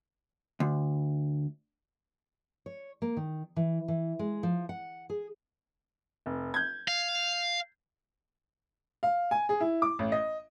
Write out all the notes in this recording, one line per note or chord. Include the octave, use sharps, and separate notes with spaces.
D2
C#5
A#3
D#3
E3
E3
G#3
F3
F#5
G#4
F1
G6 G#6
F5
F5
G#5
G#4
E4
D6
A1
D#5